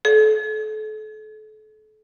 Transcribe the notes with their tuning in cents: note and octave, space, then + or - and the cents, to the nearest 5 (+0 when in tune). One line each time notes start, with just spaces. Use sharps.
A4 -35